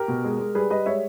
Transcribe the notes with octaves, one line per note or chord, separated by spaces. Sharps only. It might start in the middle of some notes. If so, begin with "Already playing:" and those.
Already playing: G4 A#4
B2
G#3
G#3
G3 G#4 B4
G3 B4 D#5
G#3 C#5 E5